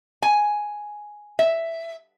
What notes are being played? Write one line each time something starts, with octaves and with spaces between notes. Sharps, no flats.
G#5
E5